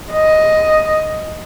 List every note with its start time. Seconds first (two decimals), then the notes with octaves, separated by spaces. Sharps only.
0.11 D#5